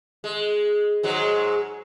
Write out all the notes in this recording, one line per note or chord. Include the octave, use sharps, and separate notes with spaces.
G#3
G#2 F#3 G#3